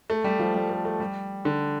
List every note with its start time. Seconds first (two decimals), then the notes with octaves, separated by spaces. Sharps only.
0.10 A3
0.24 G3
0.39 F3
0.55 G3
0.70 A3
0.85 A3
1.00 G3
1.45 D3